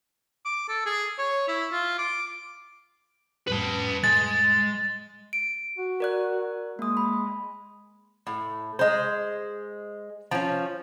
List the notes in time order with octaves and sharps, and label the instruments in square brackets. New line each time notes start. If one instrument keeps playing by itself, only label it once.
[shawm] D6
A4
G#4
C#5
E4
F4
D6
[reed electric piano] F2 A2 G3 [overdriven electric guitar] B4 A5
[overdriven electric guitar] G#3 [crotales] A6
[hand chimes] D7
[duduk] F#4
[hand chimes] A#4 D5 F#6
[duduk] G#3 [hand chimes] A#3 D#6
[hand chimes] B5
[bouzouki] A2
G#3 C5
F3 C#4